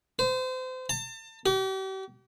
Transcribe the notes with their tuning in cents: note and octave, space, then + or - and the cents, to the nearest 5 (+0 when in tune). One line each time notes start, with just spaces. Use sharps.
C5 -30
A5 +35
G4 -40